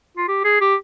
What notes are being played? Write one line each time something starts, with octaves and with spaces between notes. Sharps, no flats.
F4
G4
G#4
G4